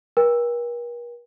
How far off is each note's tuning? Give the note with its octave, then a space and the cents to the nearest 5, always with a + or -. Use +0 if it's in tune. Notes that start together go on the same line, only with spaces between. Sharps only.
A#4 +45 G5 +40